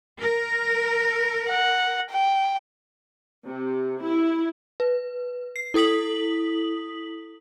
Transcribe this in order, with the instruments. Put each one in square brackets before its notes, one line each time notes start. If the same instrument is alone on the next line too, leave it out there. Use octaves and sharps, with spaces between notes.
[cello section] A#4
[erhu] F#5
G5
[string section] C3
E4
[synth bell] B4
C7
E4 A4 D#6 B6 F#7